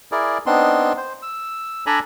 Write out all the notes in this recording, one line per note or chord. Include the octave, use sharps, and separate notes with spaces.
E4 G#4 A#4 D5
B3 C4 D4 D#4 C6
C5
E6
D4 A4 D5 G#5 A#5 B5